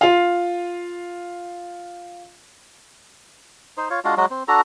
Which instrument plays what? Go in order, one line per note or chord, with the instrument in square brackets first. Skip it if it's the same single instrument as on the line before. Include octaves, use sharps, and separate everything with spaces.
[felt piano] F4 F5
[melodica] D#4 C5
F4 C#5
G#3 D4 F4 F#4
F#3 G#3 F#4
C4
D4 F#4 A4 A#5